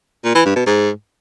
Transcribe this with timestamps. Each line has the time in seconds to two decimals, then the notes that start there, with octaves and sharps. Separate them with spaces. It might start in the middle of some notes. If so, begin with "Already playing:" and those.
0.25 A#2
0.35 E3
0.45 G2
0.56 B2
0.66 G#2